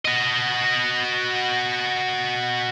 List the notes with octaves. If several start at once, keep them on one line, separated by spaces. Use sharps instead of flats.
F#4 D#5